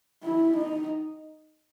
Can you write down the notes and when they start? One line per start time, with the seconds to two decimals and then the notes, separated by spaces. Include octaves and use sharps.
0.24 E4
0.57 D#4